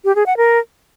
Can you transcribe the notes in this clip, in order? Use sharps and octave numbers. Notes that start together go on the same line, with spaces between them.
G4
G#4
F#5
A#4